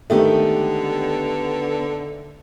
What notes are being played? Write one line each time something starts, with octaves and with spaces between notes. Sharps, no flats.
D3 D#3 G#3 A3 B3 G4